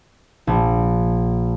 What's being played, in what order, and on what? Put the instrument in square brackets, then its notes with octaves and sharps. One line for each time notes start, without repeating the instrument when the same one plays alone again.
[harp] A#1